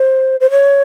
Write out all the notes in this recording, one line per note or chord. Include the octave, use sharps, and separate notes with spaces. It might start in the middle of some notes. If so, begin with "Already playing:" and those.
Already playing: C5
C5
C#5